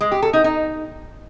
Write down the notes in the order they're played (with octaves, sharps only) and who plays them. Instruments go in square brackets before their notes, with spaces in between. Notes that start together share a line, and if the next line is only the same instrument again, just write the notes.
[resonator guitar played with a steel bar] G#3
G4
A4
D#4
D#4